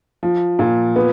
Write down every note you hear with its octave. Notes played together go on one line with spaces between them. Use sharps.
F3
A#2
B3